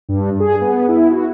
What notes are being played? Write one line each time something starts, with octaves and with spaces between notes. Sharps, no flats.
G2
G#4
B3
E4
F#4